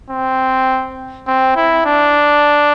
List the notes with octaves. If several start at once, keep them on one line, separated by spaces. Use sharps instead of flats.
C4
C4
E4
D4